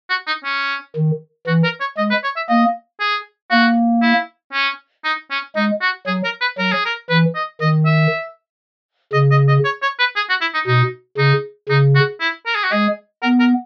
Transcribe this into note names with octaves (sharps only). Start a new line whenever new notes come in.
F#4
D#4
C#4
D#3
E3 F#4
A#4
C#5
G#3 D#5
B4
C#5
E5
A#3 D#5
G#4
A#3 F#4
E4
C#4
D#4
C#4
G#3 D#4
F#4
F#3 G#4
A#4
B4
F#3 A#4
G#4
A#4
E3 B4
D#5
D#3 D#5
E5
C#3 D#5
D#5
D#5
C#5
C#5
B4
G#4
F#4
E4
D#4
B2 D#4
C#3 D#4
C#3 D#4
F#4
E4
A#4
G#4
F#4
G#3 G#4
B3 A#4
A#4